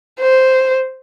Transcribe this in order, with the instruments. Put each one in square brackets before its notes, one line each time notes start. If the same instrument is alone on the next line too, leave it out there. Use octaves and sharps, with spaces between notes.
[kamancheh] C5